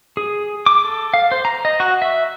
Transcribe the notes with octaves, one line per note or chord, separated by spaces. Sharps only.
G#4
D6
A4
F5
C5
A#5
D#5
F#4
E5